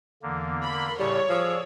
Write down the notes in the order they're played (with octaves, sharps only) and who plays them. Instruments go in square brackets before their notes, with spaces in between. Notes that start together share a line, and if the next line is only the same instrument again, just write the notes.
[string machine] E2 [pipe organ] D3 A#3
[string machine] A#4 C6 [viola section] B5
[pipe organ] A2 C#3 A4 [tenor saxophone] G3 [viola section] C#5 [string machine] D5
[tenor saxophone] F3 [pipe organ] G#4 E6